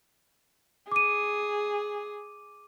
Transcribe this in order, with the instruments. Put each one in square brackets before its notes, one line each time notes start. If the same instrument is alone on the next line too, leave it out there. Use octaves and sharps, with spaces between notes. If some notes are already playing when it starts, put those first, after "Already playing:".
[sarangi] G#4 [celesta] D6 D#7